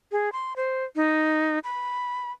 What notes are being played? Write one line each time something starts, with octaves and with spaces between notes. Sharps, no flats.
G#4
C6
C5
D#4
B5